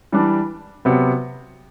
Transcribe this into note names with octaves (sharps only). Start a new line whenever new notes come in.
E3 G3 D4
C3 F#3 B3